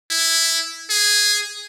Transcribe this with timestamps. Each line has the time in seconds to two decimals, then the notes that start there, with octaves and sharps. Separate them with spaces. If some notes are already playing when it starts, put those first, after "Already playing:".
0.10 E4
0.90 G#4